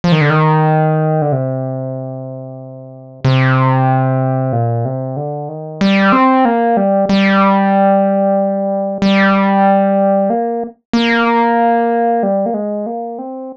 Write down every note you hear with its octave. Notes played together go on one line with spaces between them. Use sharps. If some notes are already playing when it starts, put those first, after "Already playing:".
F3
D#3
D3
D#3
D3
C3
C3
A#2
C3
D3
D#3
G3
C4
A#3
G3
G3
G3
A#3
A#3
G3
A#3
G#3
A#3
C4